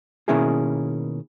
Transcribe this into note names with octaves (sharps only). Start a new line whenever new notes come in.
B2 D#3 A#3 C#4 E4 G#4